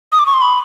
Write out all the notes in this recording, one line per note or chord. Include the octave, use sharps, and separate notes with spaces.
D#6
D6
C#6
C6
B5